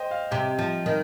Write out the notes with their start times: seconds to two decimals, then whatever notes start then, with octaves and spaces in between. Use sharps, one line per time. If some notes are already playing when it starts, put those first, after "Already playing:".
Already playing: C5 D#5 G5
0.11 F5
0.31 C3 G5
0.59 F3
0.86 D#3